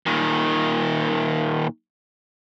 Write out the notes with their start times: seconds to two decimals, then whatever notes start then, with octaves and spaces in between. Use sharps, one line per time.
0.06 A#2 D#3